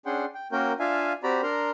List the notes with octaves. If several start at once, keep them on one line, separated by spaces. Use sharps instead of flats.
C#4 D4 G#4 F#5 G5 C6
G5
A#3 C#4 F#4 A#4 G5 G6
D4 F4 E5 F5 G#5
C4 F#4 G4 D5 A#5 B5
D4 A#4 A#5 C6